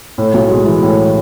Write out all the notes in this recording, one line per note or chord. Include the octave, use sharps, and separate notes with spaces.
A2
B1
G#3
E3
A2